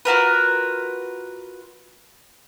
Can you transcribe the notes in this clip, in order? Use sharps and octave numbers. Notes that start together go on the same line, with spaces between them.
F4 F#4 A#4 B4